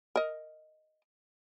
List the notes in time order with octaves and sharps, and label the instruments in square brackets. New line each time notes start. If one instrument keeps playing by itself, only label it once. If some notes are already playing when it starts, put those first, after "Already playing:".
[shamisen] A#4 D#5